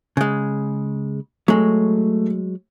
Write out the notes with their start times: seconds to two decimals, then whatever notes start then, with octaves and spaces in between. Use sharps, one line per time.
0.17 C#3 G#3
1.48 F#3 G#3 A3